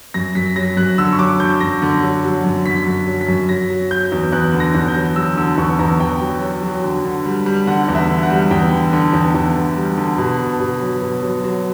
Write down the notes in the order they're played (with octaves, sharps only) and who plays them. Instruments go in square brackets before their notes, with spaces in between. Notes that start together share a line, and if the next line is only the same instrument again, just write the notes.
[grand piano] F#2 A#6
F#2 B6
F#3 A#6
F#2 F#6
D3 E6
C#6
F#3 D6
D3 G6
F#2 A#6
D3
F#3
F#3
F#2
D3 B6
F#2
F#3
B6
F#2
F#3 A#6
F#3
F#3 G6
E2
E2 F#6
D3
A#6
E2
G6
F#3
F#3 E6
D3 E6
E2 C#6
E2 A#5
E2 G5
F#3
F#3
F#3
D3
D3
G3
G3
D3 F#5
E2
E5
D3
F#5
G3
E2 G5
D3
D3
E2
E2
D3
G3
D3
B2
B2
B2
F#3
B2
F#3
F#3